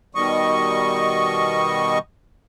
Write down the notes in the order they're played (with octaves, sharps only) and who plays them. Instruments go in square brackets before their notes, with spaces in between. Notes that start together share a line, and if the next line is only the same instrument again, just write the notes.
[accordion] B2 D#3 G3 D#5 C#6